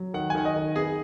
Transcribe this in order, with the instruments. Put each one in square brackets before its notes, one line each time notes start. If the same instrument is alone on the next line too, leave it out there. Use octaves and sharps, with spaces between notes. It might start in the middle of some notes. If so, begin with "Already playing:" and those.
Already playing: [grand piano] F#3
D#3 F#5
G#5
D#3 F#5
D#5
D#3
B3 G#4